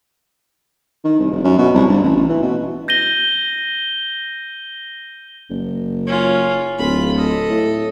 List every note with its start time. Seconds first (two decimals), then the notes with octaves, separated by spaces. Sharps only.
1.04 D#3
1.19 C2
1.31 F1
1.44 F#2
1.58 B2
1.74 C2
1.89 G1
2.02 A1
2.16 A1
2.29 E3
2.42 B2
2.88 G6 A#6 D#7 G7
5.50 F#1
6.07 C#4 F4
6.79 D1 F4 B5
7.15 A4 D#5
7.50 A2